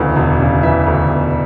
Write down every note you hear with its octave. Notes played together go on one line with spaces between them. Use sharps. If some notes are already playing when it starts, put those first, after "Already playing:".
Already playing: E1 D2 C#3 E3
E1
C#3
E3 E5
D2
E1